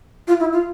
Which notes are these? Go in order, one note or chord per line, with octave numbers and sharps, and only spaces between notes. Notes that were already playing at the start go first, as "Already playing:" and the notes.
F4
E4
F4